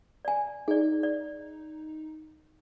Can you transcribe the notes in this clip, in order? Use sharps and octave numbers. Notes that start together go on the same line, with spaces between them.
D5 G#5
D#4 G#4 D5
D5